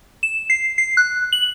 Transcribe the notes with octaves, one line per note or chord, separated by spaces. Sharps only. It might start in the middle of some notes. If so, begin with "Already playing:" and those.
E7
C7
C7
F#6
F#7